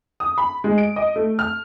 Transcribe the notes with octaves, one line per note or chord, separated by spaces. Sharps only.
D#6
B5
G#3
D7
D#5
A3
F6